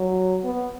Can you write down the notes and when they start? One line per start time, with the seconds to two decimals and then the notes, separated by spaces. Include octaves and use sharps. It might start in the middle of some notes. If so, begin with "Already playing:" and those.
Already playing: F#3
0.44 B3